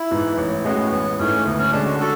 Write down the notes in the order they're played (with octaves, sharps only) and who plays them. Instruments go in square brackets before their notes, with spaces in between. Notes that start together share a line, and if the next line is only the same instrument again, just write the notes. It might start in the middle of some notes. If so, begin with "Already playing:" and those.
Already playing: [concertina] E4
[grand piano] G#2 E3 B3
A1
[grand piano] A2 G#3 C#4 F#4 [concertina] B3
[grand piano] A1 [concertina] B3
[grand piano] G#2 E3 A3 [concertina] C#4
[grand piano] D2 [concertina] B3
[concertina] C#4
[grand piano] D3 G#3 C#4 [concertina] D4
[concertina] F#4
F#4 A4